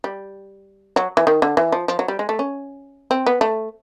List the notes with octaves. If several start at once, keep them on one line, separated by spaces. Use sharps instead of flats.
G3
F#3
E3
D#3
D3
E3
F3
F3
F#3
G3
G#3
A3
C#4
C4
B3
A3